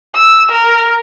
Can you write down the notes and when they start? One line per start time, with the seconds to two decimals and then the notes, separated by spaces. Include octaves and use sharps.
0.15 E6
0.51 A#4